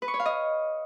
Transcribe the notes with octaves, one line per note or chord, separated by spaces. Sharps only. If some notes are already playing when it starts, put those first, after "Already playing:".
B4
C#6
C#5
F5
D#5